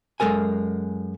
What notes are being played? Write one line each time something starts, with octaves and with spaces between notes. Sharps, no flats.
F#2 G#3 A4 A#4 G#5